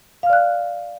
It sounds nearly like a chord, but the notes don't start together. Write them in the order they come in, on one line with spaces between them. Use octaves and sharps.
F5 F6 D5 F#6